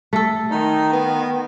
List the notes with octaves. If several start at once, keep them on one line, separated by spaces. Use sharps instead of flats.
A3 A4
D#3 D#4
B3